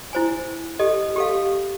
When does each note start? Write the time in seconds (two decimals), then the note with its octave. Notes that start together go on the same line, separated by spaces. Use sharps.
0.13 E4 C5 G#5
0.79 G4 A4 D#5
1.16 G4 A4 F5